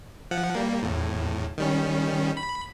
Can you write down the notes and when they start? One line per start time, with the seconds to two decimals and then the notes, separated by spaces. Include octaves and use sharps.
0.31 F3 F#5
0.55 G3 A#3
0.82 E2 A2
1.58 D#3 G3 C#4
2.37 B5